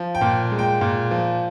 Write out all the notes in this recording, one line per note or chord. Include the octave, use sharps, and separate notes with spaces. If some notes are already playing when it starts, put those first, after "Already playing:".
Already playing: F3
G5
A#2
G#3
G5
A#2
F3